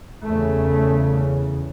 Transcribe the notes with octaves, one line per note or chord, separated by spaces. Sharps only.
E2 C#3 A3